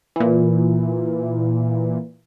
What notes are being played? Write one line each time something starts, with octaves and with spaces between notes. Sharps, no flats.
A#2 E3